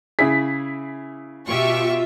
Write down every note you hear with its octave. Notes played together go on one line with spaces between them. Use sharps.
C#3 E4 G#4 B6
B2 F4 G4 E5 C#6